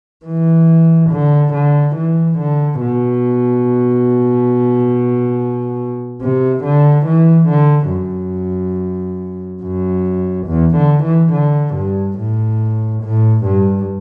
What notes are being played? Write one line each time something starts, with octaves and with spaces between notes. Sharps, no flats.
E3
D3
D3
E3
D3
B2
C3
D3
E3
D3
F#2
F#2
E2
D3
E3
D3
G2
A2
A2
G2